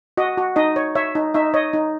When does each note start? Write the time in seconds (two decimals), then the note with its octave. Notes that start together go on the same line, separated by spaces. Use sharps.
0.17 F#4 D#5
0.38 F#4
0.56 D#4 D#5
0.76 C#5
0.95 C#5 E5
1.15 D#4
1.34 D#4 E5
1.54 C#5 D#5
1.73 D#4